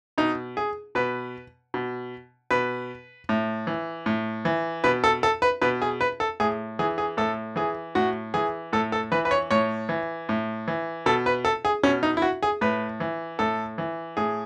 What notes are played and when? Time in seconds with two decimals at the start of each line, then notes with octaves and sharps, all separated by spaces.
0.18 B2 D#4
0.57 G#4
0.95 B2 B4
1.74 B2
2.51 B2 B4
3.29 A2
3.67 E3
4.06 A2
4.45 E3
4.84 B2 B4
5.04 A4
5.23 A4
5.42 B4
5.61 B2 B4
5.82 G#4
6.01 B4
6.20 A4
6.40 A2 G#4
6.79 E3 G#4
6.98 G#4
7.17 A2 A4
7.56 E3 G#4
7.95 A2 F#4
8.34 E3 G#4
8.73 A2 A4
8.92 A4
9.12 E3 B4
9.25 B4
9.31 C#5
9.51 A2 C#5
9.89 E3
10.29 A2
10.68 E3
11.06 B2 A4
11.26 B4
11.45 A4
11.65 G#4
11.83 B2 C#4
12.03 D#4
12.17 E4
12.22 F#4
12.43 G#4
12.61 A2 B4
13.00 E3
13.39 A2 A4
13.78 E3
14.17 A2 G#4